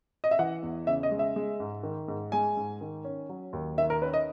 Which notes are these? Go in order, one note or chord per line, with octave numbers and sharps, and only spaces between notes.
D#5
E5
E3 F#5
E2
C#3 E5
D#5
G#3
E5
G#3
G#2
D#3
G#2
G#3 G#5
G#2
D#3
C#4
F#3
D#2
D#3 E5
A#4
C#4 B4
D#5